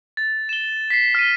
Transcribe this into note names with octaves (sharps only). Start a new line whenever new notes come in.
A6
E7 G7
B6 C7
F6 B6 D#7